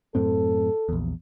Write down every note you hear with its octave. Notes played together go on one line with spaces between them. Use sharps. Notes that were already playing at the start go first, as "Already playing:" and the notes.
F#2 A2 C4 A4
A#1 E2